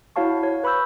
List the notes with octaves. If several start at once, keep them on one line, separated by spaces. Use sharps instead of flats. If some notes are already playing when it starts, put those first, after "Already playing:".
E4 F#4 C#5 F5 A5 C#6
C#5
B4 B5 C#6 E6 G6